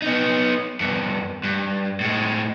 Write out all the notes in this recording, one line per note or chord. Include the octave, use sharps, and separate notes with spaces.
B3 D#4
E2 G2
G2
A2 G#3